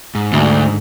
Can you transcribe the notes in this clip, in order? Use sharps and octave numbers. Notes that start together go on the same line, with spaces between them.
G#2
D2